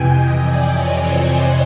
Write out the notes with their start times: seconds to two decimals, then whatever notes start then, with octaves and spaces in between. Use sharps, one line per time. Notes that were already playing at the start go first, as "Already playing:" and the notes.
Already playing: F2 C3 E3 G5 G#5
0.16 D#5
0.45 D5
0.73 C#5
1.01 C5
1.29 C#5